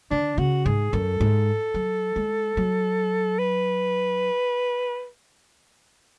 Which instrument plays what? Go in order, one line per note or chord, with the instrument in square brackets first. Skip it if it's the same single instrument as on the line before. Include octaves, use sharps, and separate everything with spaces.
[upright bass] D3 [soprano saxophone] D4
[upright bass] C#3 [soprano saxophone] F#4
[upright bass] G#2 [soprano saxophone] G#4
[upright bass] F#2 [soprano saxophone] A4
[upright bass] G#2
F#3
G#3
F#3
[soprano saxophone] B4